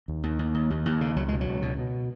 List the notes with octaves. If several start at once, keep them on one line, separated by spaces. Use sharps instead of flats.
D#2
D#2
D#2
D#2
D#2
D#2
C#3
C#2 F#3
B2 G#3
F#3
C#2
B2
B2